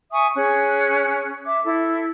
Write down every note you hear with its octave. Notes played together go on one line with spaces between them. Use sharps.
E5 G#5 C#6 D#6
C#4 G#4 F#6
E5 D6
E4 A4